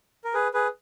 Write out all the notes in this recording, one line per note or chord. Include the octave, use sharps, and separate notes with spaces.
A#4
G#4 B4
G#4 B4